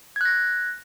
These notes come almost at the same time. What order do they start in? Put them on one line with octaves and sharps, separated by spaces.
G#6 F#6 A#6